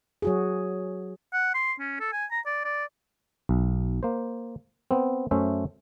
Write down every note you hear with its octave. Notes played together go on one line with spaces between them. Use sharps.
F#3 F#4 G#4
F#5
C6
C#4
A4
G#5
A#5
D5
D5
B1
A#3 C5
B3 C4
F#2 A3 C#4 C5 E5